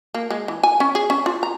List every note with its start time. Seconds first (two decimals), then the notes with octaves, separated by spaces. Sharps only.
0.14 A#3
0.30 G#3
0.48 E3
0.63 G#5
0.80 C#4
0.95 G#4
1.10 C#4
1.26 F4
1.43 A#5